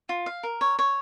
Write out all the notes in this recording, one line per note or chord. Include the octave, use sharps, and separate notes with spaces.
F4
F5
A#4
C#5
C#5